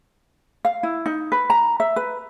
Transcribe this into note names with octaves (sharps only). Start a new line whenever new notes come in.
F5
E4
D#4
B4
A#5
E5
B4